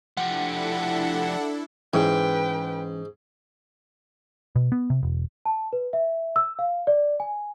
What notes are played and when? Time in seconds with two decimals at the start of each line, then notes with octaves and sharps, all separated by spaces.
0.17 F3 D4 E4 G4 A4 F#5
1.94 G#2 E3 C#4 B4 G5
4.56 B2
4.72 B3
4.90 C3
5.03 E1
5.46 A5
5.73 B4
5.93 E5
6.36 E6
6.59 F5
6.87 D5
7.20 G#5